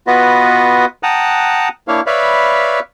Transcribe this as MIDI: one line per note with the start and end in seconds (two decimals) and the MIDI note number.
0.07 0.85 59
0.07 0.85 65
0.07 0.85 66
0.07 0.85 71
0.07 0.85 75
1.03 1.69 78
1.03 1.69 79
1.03 1.69 81
1.03 1.69 82
1.03 1.69 87
1.03 1.69 90
1.88 2.01 58
1.88 2.01 62
1.88 2.01 64
1.88 2.01 73
1.88 2.01 77
2.07 2.80 71
2.07 2.80 73
2.07 2.80 74
2.07 2.80 76
2.07 2.80 77
2.07 2.80 83